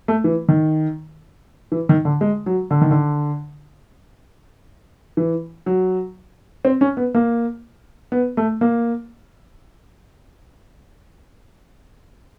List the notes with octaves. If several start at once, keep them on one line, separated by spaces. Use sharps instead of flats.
A3
E3
D#3
E3
D#3
D3
G#3
F#3
D3
D#3
D3
E3
F#3
C4
C#4
B3
A#3
B3
A3
A#3